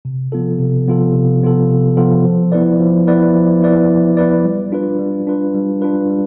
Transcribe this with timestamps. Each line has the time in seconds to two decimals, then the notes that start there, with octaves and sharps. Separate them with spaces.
0.05 C3
0.32 F3 B3 F4 A4
0.60 C3
0.87 F3 B3 F4 A4
1.14 C3
1.42 F3 B3 F4 A4
1.70 C3
1.96 F3 B3 F4 A4
2.25 F3
2.52 B3 E4 B4 D5
2.80 F3
3.07 B3 E4 B4 D5
3.35 F3
3.62 B3 E4 B4 D5
3.89 F3
4.17 B3 E4 B4 D5
4.44 G3
4.72 D4 F4 B4
4.99 G3
5.27 D4 F4 B4
5.55 G3
5.82 D4 F4 B4
6.10 G3